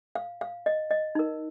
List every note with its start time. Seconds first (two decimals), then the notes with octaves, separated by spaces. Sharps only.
0.15 F5
0.41 F5
0.66 D#5
0.91 D#5
1.15 D#4 A#4